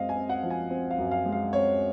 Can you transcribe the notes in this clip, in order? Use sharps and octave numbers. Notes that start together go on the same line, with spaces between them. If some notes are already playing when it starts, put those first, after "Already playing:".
Already playing: F#2 G#3 C4 D#5 F5
G#5
C4
F#5
F3
G#5
C4
F5
F#2
F5
G#3
F5
C4 C#5